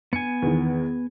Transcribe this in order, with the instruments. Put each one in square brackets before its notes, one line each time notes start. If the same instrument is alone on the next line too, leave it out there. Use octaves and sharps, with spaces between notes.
[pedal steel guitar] B3 G#5 [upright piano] C#7
[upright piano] E2 D#3